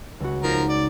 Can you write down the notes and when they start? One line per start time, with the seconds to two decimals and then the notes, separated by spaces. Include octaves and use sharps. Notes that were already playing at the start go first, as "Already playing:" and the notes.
0.20 C#2 F#4
0.43 F3 D#4 A#4
0.69 D5